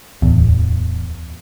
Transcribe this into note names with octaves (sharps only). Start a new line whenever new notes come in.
D1 E2